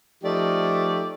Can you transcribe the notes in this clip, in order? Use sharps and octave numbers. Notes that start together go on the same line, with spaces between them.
F3 A3 D#4 G4 D5